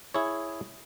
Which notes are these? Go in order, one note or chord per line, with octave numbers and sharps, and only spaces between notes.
E4 G#4 C#5